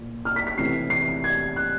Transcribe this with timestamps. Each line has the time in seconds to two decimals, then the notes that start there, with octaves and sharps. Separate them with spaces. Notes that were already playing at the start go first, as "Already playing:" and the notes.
Already playing: A#2
0.25 F6
0.36 B6
0.47 B6
0.57 C3 E3 A3 C#4 E4 C7
0.90 C7
1.24 G#6
1.56 F#6